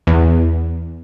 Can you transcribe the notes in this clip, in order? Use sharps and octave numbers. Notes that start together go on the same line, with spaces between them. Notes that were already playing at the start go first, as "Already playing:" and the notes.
E2